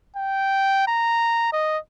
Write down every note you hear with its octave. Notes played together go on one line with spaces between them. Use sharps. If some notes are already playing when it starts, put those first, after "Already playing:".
G5
A#5
D#5